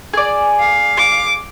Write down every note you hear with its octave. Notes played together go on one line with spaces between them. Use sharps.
G#4 D5
F5
D6